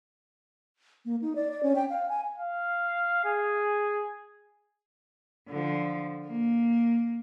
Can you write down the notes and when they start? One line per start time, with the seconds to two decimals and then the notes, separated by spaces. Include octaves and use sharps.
1.05 A#3
1.22 D#4
1.36 D5
1.52 D5
1.63 C#4
1.76 G5
1.90 F5
2.09 G#5
2.38 F5
3.25 G#4
5.48 D3 F3
6.26 A#3